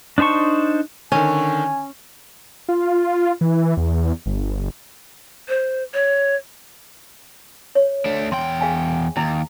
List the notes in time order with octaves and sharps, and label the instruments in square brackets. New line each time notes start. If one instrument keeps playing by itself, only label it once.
[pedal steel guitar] D4 D#4 C5 A5 C#6
[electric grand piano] D3 D#3 [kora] C#4 [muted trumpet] G#5
[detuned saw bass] F4
E3
E2
G1
[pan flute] C5
C#5
[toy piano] C#5
[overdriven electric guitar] A3 D4
[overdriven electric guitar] E2 G5 [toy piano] C6
[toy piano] G#4 F5 G#5
[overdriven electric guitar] D#2 [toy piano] E4